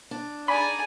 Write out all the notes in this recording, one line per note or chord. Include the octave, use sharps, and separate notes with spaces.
D4
D#4 G#4 D5 G#5 B5